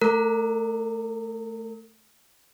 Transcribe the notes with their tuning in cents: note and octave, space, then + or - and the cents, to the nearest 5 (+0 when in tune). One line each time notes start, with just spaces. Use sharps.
A3 +0 A#4 -35